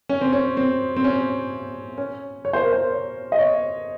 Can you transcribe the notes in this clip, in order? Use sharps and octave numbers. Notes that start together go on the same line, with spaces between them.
C#4
C4
C#4
C4
C4
C#4
C#4
C#5
C5
A#4
C5
C#5
D#5
C#5